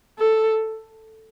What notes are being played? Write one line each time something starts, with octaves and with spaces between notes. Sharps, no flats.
A4